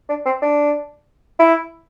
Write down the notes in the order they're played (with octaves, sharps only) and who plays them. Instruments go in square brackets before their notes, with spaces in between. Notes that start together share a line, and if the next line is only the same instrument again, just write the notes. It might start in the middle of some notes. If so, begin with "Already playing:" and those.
[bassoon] D4
C4
D4
E4